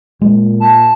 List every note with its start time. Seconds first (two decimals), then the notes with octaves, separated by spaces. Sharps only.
0.22 A#2 G#3
0.60 A5